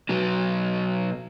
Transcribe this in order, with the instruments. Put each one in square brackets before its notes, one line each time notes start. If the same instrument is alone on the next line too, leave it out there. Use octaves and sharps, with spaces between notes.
[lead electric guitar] B2 F#3